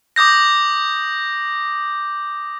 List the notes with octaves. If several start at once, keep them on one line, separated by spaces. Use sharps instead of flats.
D6 D#6 G6 A#6